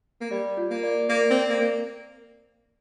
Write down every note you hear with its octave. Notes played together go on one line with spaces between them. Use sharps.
A#3
G3 D5
F4
A#3
D5
A#3 D5
C4
D5
A#3
A#3